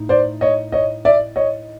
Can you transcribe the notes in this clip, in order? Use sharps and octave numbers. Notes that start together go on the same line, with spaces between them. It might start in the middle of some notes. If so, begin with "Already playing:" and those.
Already playing: A2 D#4
C5 D5
C#5 D#5
C#5 D#5
D5 E5
C#5 D#5